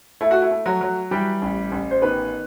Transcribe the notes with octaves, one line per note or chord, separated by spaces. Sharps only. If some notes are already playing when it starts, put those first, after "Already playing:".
A3 E4
F#4
E4
A3
F#3 F#4
F#3
E3 G3 G4
A1
A1
C5
D#3 B3 B4